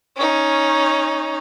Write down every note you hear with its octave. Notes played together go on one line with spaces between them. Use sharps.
C#4 D#4